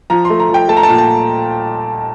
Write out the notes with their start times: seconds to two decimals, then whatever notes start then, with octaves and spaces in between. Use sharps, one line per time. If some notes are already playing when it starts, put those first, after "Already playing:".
0.10 F3 A#5
0.25 A3 C6
0.40 A#5
0.49 F3
0.54 G5
0.68 A3 A5
0.77 A#5
0.83 A#2 A5
0.98 A5